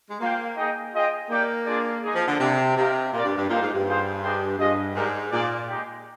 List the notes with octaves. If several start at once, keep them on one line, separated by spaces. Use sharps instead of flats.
G#3
A#3 F4 C5 G5
D#4 G#4 D#5 G5
F4 G#4 D#5 G5
A#3 D#4 G4 D5 G5
D4 F4 G#4 D5
G#3 D#4 G#4
F3
D3
C3 G3 A#3 D4
C3 C4 D#4 G4 A#4 F5
A#2 F4 A#4 D5
G2
G2
A#2 D#4 G4 C5 F5
G#2
G2
F4 G#4 C5
D4 G#4 C5 D#5 G5
G2 F4 G#4 D#5
G#2 G#3 D4 G4 A#4
A#2 F4 G#4 D5
G#3 D#4 G4